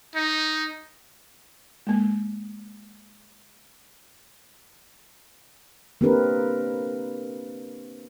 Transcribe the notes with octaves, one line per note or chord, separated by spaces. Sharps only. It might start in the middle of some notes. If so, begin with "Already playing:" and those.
D#4
G#3 A#3
A#3 C4 D4 G4 A#4 B4